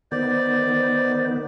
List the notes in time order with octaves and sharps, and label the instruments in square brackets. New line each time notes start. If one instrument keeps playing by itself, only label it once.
[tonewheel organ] D#3 B3 [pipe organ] C5 [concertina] D5